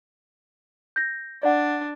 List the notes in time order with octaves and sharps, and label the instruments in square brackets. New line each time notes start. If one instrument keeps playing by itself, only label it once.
[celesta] G6 A#6
[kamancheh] D4 [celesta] D5 F#5